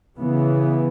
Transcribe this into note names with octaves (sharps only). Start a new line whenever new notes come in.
C#3 E3 B3